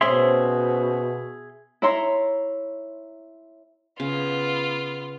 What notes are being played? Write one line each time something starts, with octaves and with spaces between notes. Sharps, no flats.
B2 C4 C#4 G#4 E5 C6
E4 C#5 E5 A#5 C6
C#3 B3 F4